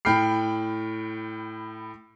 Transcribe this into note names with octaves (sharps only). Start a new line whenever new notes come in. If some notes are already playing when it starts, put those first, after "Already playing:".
A2 G5 B5 F6 C7